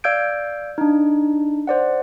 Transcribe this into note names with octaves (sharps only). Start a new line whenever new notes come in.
D5 F5 E6 G6 G#6 D7
D4 D#4
C5 D5 F#5